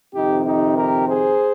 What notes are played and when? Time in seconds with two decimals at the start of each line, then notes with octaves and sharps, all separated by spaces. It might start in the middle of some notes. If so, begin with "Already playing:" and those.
0.14 F2 C3 D#3 D#4 G4
0.45 D#4 G4
0.76 G4 A#4
1.07 G#4 C5